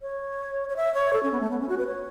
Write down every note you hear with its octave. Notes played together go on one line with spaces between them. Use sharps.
C#5
C#5
E5
C#5
A4
C#4
B3
A3
B3
C#4
F#4
B4
C#5